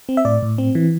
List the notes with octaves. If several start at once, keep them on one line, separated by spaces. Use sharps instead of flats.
C4
E5
A2 D5
A2
C4
E3